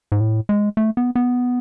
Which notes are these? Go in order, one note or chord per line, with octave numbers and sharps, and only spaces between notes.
G#2
A2
G#3
A3
B3
B3